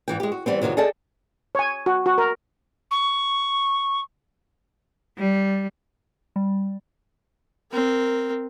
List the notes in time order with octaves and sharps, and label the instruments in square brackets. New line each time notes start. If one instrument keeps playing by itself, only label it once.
[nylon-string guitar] G#2 E3 G5
G#3 G4
F#4
E3 G3 B3 C4
F2 A2 C3 D#3 F#3
G#4 A4 D5 D#5 G5 A5
[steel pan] C#5 G#5
F#4
F#4
A#4
[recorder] C#6
[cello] G3
[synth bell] G3
[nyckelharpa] C4 A#4